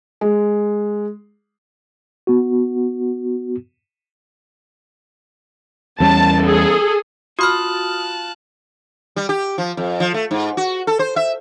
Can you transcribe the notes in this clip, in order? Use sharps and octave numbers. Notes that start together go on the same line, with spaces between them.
G#3
B3 F#4
E2 G3 C#4 A5
G#4 A4
F4 F#4 A5 B5 D#6 F6 F#6
G3
G4
F3
F2
F3
A3
G#2
F#4
A4
C5
E5